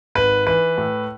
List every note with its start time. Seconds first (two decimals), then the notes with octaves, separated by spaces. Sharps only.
0.15 G#1 B4
0.47 E3 B4
0.78 A2